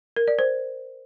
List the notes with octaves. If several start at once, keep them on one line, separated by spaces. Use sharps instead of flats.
A#4
D5
C5